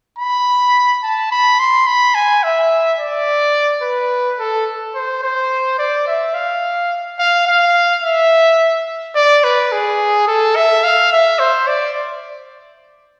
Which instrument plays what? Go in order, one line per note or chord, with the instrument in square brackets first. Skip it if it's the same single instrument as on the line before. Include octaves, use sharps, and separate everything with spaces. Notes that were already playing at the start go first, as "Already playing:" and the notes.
[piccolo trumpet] B5
A5
B5
C6
B5
G#5
E5
D5
B4
A4
C5
C5
D5
E5
F5
F5
F5
E5
D5
B4
G#4
A4
E5
F5
E5
C5
D5